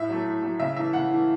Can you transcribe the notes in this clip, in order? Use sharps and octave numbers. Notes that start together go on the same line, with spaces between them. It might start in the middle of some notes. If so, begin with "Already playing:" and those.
Already playing: A2 E5
F#3 A3
A2
F#3 A3
C#3 E5
E3 A3 E5
C#3 F#5
E3 A3